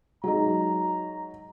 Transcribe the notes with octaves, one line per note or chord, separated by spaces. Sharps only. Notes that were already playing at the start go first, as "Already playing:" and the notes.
F#3 G#3 D#4 A#5